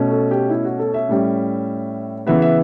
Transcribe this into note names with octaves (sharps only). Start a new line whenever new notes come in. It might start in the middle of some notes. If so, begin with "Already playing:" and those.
Already playing: B2 A3 C#4
A4
G4
E4
F#4
A4
E5
A2 G3 C#4
C#3 E3 B3 E5
E5